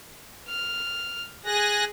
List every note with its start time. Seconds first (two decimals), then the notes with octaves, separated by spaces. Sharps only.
0.48 F6
1.45 G#4 G#5 F#6 A#6